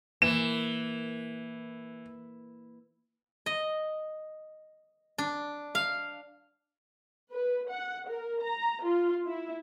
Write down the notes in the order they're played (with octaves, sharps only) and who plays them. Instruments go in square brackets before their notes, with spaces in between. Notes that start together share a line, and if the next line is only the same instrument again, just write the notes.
[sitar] E3 [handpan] A#3 [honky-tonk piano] E7
[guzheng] D#5
D4
F5
[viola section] B4
F#5
A#4
A#5
F4
E4